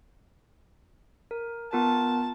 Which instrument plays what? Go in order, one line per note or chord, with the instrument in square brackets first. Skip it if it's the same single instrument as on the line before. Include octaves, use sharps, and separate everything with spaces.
[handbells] A#4
[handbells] B3 F4 A#4 [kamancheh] A5